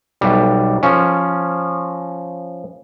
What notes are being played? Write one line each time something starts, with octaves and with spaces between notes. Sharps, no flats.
B1 G3
F3 C#4